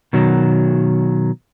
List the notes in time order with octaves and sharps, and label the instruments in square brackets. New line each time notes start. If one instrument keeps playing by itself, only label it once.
[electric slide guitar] B2 D#3 F#3